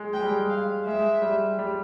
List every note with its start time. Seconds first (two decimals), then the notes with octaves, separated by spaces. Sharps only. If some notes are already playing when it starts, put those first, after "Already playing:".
Already playing: G#3
0.13 G#3 G5
0.22 G3
0.31 G#3
0.50 F5
0.86 G#3 E5
1.22 G3
1.59 G3